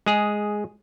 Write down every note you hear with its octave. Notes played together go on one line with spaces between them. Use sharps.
G#3 G#4